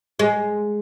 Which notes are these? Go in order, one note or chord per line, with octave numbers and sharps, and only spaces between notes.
G#3